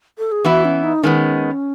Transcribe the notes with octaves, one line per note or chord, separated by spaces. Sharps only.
A4
G#4
E3 B3 E4 F#4
C#4
D#4
D#3 G#3 B3 C#4